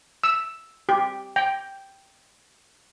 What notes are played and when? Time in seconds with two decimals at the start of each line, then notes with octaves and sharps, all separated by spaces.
0.24 E6
0.89 G4
1.36 G5